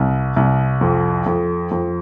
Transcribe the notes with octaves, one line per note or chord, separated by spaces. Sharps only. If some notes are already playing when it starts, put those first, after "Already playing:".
Already playing: C2
C2
F2
F2
F2